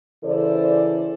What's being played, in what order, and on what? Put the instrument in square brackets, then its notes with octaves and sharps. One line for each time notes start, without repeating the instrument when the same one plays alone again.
[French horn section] C#3 E3 A4 C5 D5